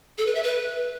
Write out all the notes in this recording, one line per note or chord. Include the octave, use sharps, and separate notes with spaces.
A4
B4
E5
B4